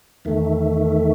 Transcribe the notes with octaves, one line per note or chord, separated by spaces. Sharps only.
E2 D#3 A3